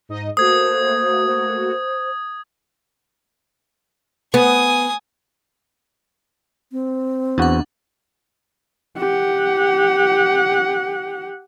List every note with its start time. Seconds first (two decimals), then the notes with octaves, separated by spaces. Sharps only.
0.09 G#2 D#4 D#5
0.37 A3 A#3 F#4 C5 D#6 G#6
1.26 C5
4.34 B3 G#5 D#6
6.72 C4
7.38 E2 D4 F#4 F#5
8.98 G4 F#5